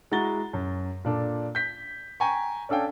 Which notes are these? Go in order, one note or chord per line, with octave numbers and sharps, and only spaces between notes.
G#3 E4 F#4 A#5 A6 G7
F#2
A#2 D4 A4
G6 B6
G5 G#5 A#5 C#6
C#4 D4 A4 F5 G5 G#5